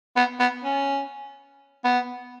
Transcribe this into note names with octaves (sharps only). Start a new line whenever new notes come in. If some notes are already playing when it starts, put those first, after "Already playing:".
B3
B3
C#4
B3